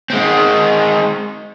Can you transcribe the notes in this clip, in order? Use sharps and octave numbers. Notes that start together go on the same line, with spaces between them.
G#3 C4